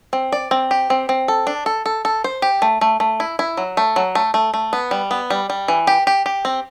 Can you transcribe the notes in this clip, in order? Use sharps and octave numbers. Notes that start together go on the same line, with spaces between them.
C4
D5
C4
G4
C4
C4
A4
D4
A4
A4
A4
C5
G4
A3
A3
A3
E4
E4
F#3
A3
F#3
A3
A3
A3
B3
G3
B3
G3
G3
E3
G4
G4
G4
C4